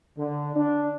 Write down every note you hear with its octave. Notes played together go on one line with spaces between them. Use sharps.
D3
D4